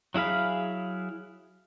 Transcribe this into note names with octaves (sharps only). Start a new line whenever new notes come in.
F#3 E4 G#4 F5 B5